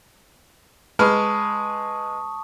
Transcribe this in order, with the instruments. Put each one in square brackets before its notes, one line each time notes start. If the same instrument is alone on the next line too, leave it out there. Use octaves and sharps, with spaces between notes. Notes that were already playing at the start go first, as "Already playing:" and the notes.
[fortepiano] G#3 B4 F6 [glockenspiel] A5 C#6 D#6